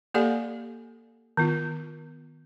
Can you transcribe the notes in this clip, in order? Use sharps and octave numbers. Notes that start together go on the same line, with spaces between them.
A#3 G4 A4 D5 F5 G#5
D#3 B3 F4